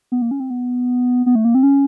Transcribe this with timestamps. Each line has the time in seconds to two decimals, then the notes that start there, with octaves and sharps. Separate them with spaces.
0.12 B3
0.22 A#3
0.31 C#4
0.40 C4
0.50 B3
1.26 B3
1.35 A3
1.45 A#3
1.55 C4
1.63 C#4